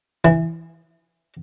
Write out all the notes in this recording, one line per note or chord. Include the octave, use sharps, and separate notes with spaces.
E3